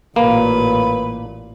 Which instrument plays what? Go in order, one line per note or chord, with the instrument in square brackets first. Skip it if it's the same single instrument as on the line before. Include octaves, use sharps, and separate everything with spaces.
[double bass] A1 A#2 [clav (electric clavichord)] A#3 [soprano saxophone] B4